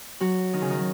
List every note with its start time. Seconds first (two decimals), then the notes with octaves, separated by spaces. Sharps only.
0.20 F#3 F#4
0.53 D#3 D#4
0.62 C#3 C#4
0.70 D#3 D#4
0.78 F#3